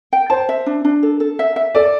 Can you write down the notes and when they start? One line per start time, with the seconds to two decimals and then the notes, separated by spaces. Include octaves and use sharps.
0.13 G5
0.30 C5 A5
0.49 E5
0.66 D4
0.85 D4
1.03 A4
1.20 A4
1.39 E5
1.56 E5
1.75 A4 D5